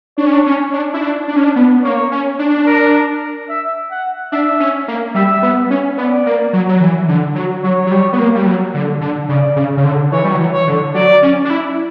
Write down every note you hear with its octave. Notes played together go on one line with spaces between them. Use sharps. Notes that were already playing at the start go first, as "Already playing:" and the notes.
D4 C#5
C#4
D4
C#4
D4
E4
D4
D4
C#4
D4
B3
A#3 C#5
C#4
D4
A#4
E5
F#5
D4 E5
C#4
A#3
G3 E5
B3
C#4
B3 D5
A#3
F#3
F#3
E3
D3
F#3
F#3 C#5
F#3
G3
B3
A#3
G3
F#3
D3
D3
C#3 D5
C#3
C#3
D3
E3 C#5
G3
F#3
E3
C#5
D3
F#3 D5
C#4
D4
E4